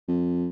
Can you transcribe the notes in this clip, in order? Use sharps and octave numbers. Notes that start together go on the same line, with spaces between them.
F2